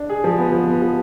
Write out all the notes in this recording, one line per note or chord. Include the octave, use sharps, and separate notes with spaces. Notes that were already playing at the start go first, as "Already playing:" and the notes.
Already playing: D4
G#4
F3
B3
F3
B3
F3